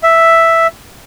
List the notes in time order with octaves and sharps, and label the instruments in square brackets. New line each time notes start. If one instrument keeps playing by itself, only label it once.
[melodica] E5